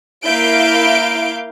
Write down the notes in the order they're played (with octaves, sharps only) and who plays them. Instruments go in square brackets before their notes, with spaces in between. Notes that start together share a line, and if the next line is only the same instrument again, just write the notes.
[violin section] A#3 E4 F5 G6 D7